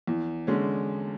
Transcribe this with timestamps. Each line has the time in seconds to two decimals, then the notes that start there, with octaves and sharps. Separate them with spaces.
0.07 E2
0.47 D3 G#3 C#4